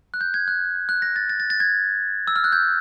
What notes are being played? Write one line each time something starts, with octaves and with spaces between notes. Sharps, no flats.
F#6
G6
G#6
F#6
F#6
A#6
A6
A6
A6
A6
G#6
E6
F6
F#6
G6